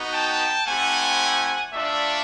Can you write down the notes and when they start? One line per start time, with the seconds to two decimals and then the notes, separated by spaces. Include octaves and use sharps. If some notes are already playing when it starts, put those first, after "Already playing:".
Already playing: B3 D#4 F#4
0.13 G5 A5
0.67 A3 C4 E4 G4 F#5 G#5
1.73 A3 D4 F4 D5 E5